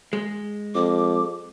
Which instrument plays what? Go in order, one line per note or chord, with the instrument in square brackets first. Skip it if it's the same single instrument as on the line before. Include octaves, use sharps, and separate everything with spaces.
[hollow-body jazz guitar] G#3
[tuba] F2 [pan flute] D6